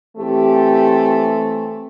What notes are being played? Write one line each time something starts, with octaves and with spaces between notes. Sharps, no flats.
E3 A3 C4 G4